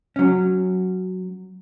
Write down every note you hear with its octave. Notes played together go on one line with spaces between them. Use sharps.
F#3 C#4